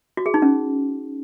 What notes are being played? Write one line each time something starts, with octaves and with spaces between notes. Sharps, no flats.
F#4
G#4
D#4
C#4